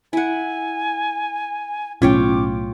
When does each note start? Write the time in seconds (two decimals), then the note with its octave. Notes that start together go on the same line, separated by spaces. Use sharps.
0.13 E4 F#5 G#5
2.02 B1 A2 C#4 F4 C#5 G5 D6